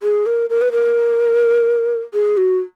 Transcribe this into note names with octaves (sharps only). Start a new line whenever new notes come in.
G#4
A#4
A#4
B4
A#4
G#4
F#4